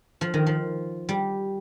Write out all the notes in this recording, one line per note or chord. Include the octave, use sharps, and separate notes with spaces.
F3
D#3
F3
G3